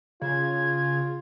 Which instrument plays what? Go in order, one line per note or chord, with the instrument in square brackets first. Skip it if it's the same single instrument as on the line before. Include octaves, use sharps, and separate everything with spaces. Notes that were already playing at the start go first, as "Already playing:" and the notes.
[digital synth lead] C#3 [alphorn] F4 [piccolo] G#6